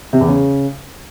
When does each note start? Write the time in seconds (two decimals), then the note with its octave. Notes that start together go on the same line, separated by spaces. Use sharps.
0.13 C3
0.21 E2
0.28 C#3